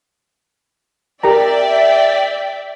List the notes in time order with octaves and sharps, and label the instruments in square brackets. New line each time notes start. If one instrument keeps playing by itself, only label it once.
[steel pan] G4 A#4 A#5 [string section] D5 E5 G5